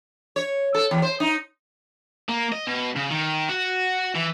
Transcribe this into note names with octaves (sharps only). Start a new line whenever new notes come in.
C#5
A4
E2
C5
D#4
A#3
D#5
B2
C#3
D#3
F#4
E3